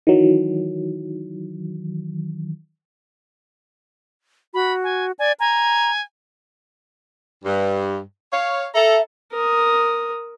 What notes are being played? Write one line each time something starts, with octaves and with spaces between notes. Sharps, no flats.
D#3 E3 F#3
F#4 B5
G#5
D5 G#5
G#5 A#5
G2
C#5 F5
A4 E5 A#5
A#4 D#6